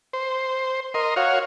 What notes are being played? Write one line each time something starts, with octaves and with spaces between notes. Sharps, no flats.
C5
A#4 D#5 C6
F#4 C#5 F5